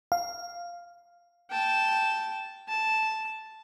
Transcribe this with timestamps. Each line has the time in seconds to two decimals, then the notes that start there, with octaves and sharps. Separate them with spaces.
0.12 F5
1.50 G5 A5
2.68 A5